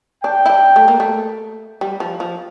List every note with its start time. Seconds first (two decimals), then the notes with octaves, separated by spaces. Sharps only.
0.23 D4 G5
0.46 E4
0.50 D4
0.76 A3
0.88 A#3
1.00 A3
1.81 G3
2.00 F3
2.20 F3